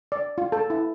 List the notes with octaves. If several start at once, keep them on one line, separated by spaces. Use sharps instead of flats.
D5
F4
A4
E4